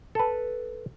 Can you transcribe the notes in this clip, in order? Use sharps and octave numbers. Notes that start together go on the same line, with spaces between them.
A4 B4